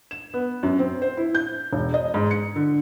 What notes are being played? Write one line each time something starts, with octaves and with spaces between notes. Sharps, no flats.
E7
B3
F#2
C4
C5
E4
G6
E1
D#5
G#2
C#7
D3